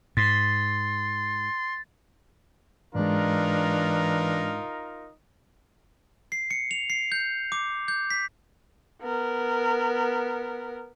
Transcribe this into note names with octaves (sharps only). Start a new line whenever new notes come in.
G#2 C6 A6
G#2 E3 G#3 D4 D#4 F4 A#4
C7
C#7
F7
C7
G6
D6
G6
B6
B3 A#4